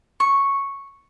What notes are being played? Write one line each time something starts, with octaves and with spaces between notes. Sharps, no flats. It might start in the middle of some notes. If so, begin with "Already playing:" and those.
C#6